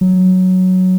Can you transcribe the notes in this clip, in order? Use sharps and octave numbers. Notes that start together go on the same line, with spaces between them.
F#3